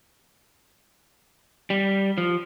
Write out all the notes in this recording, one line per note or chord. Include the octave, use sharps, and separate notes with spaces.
G3
F3